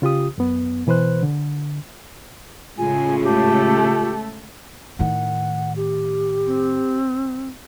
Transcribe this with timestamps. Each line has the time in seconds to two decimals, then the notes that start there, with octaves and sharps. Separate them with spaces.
0.02 C#3 F4 G4 D#6
0.38 F#2 B3
0.87 B2 E3 B4 C5 F#6
1.23 D3
2.78 A2 C#3 G#3 F4 G#5
3.24 A3 G4 A4
4.99 A2 D#3 F#5
5.76 G4
6.47 C4